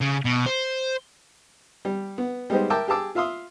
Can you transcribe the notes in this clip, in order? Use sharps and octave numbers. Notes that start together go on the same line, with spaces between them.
C#3
B2
C5
G3
B3
G3 G#3 B3 D#4 G4 C5
A#4 E5 G5 A5 D6
G4 G#4 A5 D6 E6
F4 E5 F5 C6 D#6